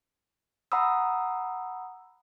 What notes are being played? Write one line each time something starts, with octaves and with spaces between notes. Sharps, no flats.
F#5 A#5 B5 D#6 E6